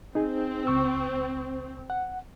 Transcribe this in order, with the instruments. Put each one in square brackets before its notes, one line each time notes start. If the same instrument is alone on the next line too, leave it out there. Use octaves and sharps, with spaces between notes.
[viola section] C4 [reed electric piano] D#4 G#4
[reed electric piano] C#2 C#6 E6
F#5